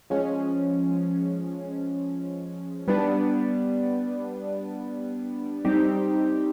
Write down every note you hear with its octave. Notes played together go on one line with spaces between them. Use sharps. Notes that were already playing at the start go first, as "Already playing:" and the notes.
F3 G#3 C#4
G3 B3 D4
G3 C4 D#4 G4